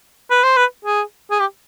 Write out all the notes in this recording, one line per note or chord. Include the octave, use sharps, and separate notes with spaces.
B4
C5
B4
G#4
G#4
G4